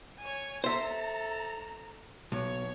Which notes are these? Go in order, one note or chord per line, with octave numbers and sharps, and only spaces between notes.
C#5 G#5
A4 C5 E5 A#5
B1 C#5